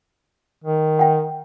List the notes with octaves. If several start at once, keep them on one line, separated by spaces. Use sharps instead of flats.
D#3
F#5 G5